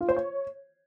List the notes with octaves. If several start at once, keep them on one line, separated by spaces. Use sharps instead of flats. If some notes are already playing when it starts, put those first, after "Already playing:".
F4
C5
C#5